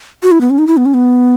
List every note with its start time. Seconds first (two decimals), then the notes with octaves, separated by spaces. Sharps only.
0.23 F#4
0.32 E4
0.41 B3
0.50 C#4
0.59 D#4
0.67 E4
0.77 B3
0.86 C#4
0.94 B3